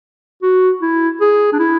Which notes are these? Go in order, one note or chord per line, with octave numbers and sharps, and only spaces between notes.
F#4
E4
G#4
D4
E4